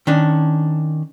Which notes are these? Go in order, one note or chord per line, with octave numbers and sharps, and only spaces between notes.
D#3 C#4 D4